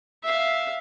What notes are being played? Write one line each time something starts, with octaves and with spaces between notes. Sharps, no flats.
E5 F5